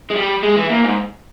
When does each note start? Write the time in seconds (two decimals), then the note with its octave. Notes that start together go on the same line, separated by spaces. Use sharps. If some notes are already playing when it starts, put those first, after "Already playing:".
0.10 G#3
0.16 G3
0.43 G#3
0.56 E3
0.70 A#2
0.84 G#2